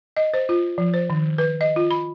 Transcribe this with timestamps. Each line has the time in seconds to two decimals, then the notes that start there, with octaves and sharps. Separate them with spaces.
0.17 D#5
0.34 C5
0.49 F4
0.78 F3
0.94 C5
1.10 D#3
1.38 B4
1.61 D#5
1.76 F4
1.91 B5